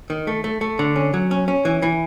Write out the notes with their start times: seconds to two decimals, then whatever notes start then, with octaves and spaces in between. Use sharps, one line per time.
0.10 D#3
0.27 A3
0.44 A3
0.61 A3
0.79 D3
0.96 C#4
1.14 F#3
1.31 C#4
1.48 C#4
1.65 E3
1.82 E3